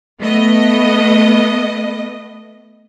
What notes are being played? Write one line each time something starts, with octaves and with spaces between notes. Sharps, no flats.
A3 B3 D#5